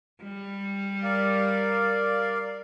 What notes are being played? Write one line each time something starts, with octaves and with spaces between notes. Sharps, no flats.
G3
A#4 D5 F5